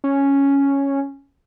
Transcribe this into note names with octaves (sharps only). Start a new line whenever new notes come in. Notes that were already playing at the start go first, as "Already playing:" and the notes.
C#4